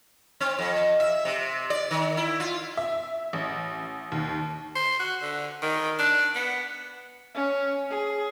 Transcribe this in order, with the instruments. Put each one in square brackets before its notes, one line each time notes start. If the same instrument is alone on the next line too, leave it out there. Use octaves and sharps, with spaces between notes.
[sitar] C4
F2
E5
C3
D5
D#3
E4
F4
[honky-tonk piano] E5
A1
D#2
[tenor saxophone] C5
F#4
D3
D#3
D4
B3
[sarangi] C#4
G#4